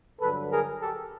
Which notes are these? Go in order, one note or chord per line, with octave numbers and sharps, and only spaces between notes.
G2 D3 F#3 A4 B4
G#4 A#4
G4 A4